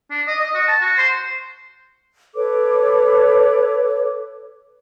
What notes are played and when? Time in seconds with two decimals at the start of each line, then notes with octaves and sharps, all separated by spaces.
0.11 D4
0.27 D#5
0.40 D#5
0.54 F#4
0.68 A5
0.81 F#4
0.98 C5
2.35 A4 B4 C#5 D6